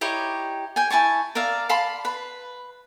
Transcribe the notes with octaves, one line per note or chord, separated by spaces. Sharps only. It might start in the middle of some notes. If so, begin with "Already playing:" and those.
D#4 E4 G4 C#5
G5 G#5
E4 G#5 A5 C#6
A#4 D5 E5 F5
F5 A5 B5 C6
B4 B5